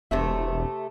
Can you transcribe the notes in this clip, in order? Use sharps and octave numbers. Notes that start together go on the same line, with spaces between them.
E1 C3 A3 E5